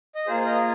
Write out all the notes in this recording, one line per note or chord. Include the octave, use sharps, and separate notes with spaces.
D#5
A#3 F4 G#4 C5
A#4 D#5